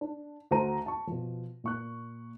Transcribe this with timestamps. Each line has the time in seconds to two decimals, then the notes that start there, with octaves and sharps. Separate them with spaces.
0.01 D4
0.51 D2 F#4 A4 C5 A#5 D#7
0.86 A5 C#6
1.07 B2 F3
1.64 A#2 C#6 F#6